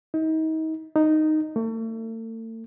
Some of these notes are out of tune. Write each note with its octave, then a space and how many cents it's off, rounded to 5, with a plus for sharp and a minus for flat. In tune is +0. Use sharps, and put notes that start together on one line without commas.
D#4 +35
D#4 -5
A3 +40